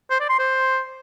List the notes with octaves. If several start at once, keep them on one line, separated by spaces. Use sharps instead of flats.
C5
D5
C6
C5